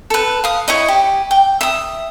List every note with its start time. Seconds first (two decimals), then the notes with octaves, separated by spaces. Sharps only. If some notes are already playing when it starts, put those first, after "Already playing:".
0.10 A4 B4
0.44 F5 D#6
0.68 E4 C#5 D#5
0.88 G4
1.31 G5
1.61 E5 D#6